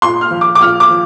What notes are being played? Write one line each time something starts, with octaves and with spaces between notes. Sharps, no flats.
A#2 C6
F6
F3
D6
D6
A#2 F6
D6
F3